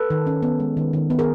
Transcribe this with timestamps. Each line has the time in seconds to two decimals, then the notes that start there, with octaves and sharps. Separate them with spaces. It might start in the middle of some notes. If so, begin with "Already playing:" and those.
Already playing: A4 B4
0.10 D#3
0.27 C#4
0.43 B3
0.60 G#3
0.77 D#3
0.93 D#3
1.10 B3
1.19 G#4 A#4